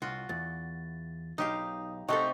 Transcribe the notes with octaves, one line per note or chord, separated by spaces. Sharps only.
C2 F4 F#4
E2 A6
B1 D#4 G4 F5 D#6
C3 A3 C4 D#4 G4 A4 F#5 C#6